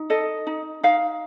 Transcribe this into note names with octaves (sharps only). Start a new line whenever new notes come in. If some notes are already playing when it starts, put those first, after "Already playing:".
Already playing: D#4
A4 D#5
D#4
D#4 F5